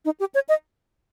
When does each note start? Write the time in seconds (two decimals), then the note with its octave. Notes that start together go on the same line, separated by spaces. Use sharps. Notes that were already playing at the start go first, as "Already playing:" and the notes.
0.05 D#4
0.20 G4
0.34 C#5
0.49 D#5